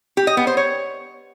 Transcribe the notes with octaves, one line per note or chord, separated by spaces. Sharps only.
G4
D#5
B3
C5
C#5